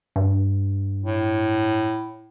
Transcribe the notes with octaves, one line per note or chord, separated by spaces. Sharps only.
G2
A2